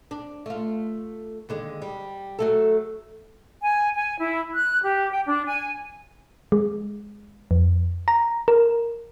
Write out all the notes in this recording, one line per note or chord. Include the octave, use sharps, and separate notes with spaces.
D4
A3 F4
D#2 D3 G#3
G3
F#3 A3 A4
G#5
G#5
E4
F#6
G4
G5
D4
G#5
G#3
F2
A#5
A#4